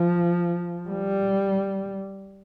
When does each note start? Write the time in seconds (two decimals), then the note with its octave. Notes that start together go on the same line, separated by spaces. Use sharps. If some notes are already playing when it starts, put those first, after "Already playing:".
Already playing: F3
0.88 G3